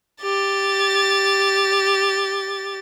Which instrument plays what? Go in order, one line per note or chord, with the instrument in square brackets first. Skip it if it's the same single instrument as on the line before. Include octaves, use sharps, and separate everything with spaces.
[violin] G4 A6